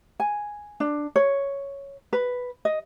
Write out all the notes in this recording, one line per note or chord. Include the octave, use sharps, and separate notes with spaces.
G#5
D4
C#5
B4
D#5